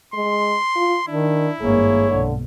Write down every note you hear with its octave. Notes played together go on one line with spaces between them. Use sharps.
G#3 C6
F4
D#3 D4 E4
G#1 G2 A#3 G#4 C#5
B1 D3